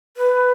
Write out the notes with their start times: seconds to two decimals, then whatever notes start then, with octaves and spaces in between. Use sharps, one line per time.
0.17 B4